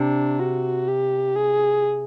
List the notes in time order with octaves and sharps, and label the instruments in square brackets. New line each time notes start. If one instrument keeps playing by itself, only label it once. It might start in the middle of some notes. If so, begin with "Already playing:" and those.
Already playing: [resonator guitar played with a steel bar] C3 [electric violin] D4
[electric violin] F#4
G4
G#4